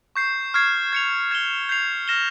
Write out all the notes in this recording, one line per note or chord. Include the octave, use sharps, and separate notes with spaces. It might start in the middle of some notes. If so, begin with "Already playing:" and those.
C#6 G6 C7
C#6 F6 G#6 C7
G#6 C#7 F7
G#6 E7 G7
G6 C7 F7
F6 A#6 E7 G7